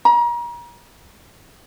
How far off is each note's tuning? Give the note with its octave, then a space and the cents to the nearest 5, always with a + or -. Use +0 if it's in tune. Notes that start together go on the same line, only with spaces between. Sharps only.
A#5 +35